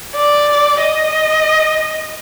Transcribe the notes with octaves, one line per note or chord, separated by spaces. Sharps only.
D5
D#5